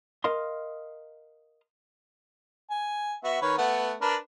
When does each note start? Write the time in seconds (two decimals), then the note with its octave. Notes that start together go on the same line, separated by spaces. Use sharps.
0.24 A#4 D#5 F5 C6
2.70 G#5
3.24 B3 F#4 E5
3.42 D#3 B4 C#5
3.58 A3 B3 F#5
4.01 D4 A#4 B4